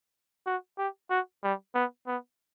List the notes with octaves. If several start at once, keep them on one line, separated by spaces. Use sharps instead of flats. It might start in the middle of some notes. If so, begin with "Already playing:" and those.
F#4
G4
F#4
G3
B3
B3